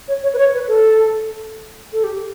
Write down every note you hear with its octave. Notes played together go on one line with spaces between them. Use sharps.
C#5
C#5
B4
C#5
B4
A4
A4
G4